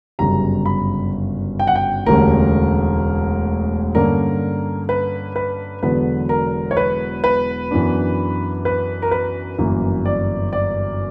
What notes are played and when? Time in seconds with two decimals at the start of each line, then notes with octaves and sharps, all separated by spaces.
0.19 G1 F#2 C#3 G3 A#5
0.66 B5
1.59 G5
1.67 F#5
1.75 G5
2.06 E1 D2 D3 G3 C#4 A#4
3.95 G2 D3 A#3 C#4 A#4
4.89 B4
5.36 B4
5.83 E1 E2 D3 F#3 B3 B4
6.29 A#4
6.71 C#5
6.77 B4
7.24 B4
7.71 F#2 E3 B3 D4
8.65 B4
9.02 A#4
9.11 B4
9.59 G1 F#2 E3 A#3
10.05 D5
10.53 D5